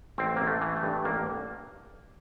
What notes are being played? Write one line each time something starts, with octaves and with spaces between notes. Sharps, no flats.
A1 C4
A1 A#3
A3
E3
A3
G2
A1 A#3